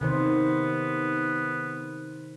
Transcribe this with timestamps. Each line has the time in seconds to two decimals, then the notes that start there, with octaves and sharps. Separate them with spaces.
0.01 C3 D#3 B3 C5